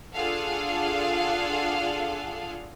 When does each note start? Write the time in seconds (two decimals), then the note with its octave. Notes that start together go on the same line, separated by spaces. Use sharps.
0.13 D4 F4 G#4 A4 F5 F#5